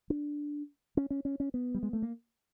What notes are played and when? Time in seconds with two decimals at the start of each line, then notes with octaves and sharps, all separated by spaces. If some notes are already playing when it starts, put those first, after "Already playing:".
0.10 D4
0.97 C#4
1.10 C#4
1.25 C#4
1.40 C#4
1.54 B3
1.75 G3
1.83 G#3
1.93 A3
2.02 A#3